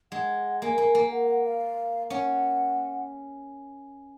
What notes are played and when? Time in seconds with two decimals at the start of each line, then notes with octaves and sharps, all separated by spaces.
0.12 G#3 F#5
0.61 A#3 G#5
0.78 A#3
0.95 A#3
1.11 F#5
1.27 F#5
1.44 F5
2.10 C#4 F#5